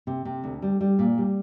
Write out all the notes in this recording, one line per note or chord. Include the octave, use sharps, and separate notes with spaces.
C3
C3
D2
G3
G3
A#2
G3